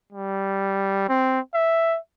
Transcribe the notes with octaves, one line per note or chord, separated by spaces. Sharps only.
G3
C4
E5